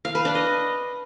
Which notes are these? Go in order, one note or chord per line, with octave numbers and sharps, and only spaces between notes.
F5
B4
D4
D#5